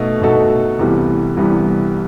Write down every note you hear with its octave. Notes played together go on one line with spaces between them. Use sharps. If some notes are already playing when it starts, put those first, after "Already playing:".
Already playing: B2 A3 D#4 F#4 A4
B2 A3 D#4 F#4 A4
C2 C3 E3 G3 B3
C2 C3 E3 G3 B3